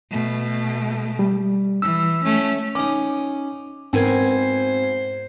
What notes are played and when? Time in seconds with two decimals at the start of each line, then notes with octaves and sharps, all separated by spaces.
0.11 B2 A3
1.19 G3
1.82 E3 E6
2.24 A3 C#4
2.75 C#4 D#4 D6
3.93 G#2 B2 C4 A#4 C5 G#5 G#6